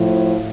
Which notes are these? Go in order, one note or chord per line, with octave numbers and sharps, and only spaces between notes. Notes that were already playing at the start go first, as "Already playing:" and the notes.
Already playing: A2 F3